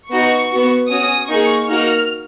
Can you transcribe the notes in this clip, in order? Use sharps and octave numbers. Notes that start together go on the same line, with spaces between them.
B3 D#4 F#4 C#6
B3 F#4
C#4 F#4 D#6
A#3 D#4 G#4 C#6
A#3 D#4 F#4 F6